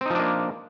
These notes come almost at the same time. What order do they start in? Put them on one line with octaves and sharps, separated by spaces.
C4 D#4 F3 D4 A#3